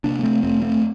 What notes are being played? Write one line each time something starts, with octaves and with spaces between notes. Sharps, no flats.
C3 A#3 D4
A#3
A3 C4
F2 A3 C4
A3 C4